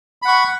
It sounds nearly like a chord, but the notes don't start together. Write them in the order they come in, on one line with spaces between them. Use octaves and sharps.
B5 F#5 C#6